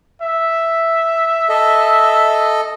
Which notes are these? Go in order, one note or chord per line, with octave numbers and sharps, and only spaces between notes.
E5
A4 D#5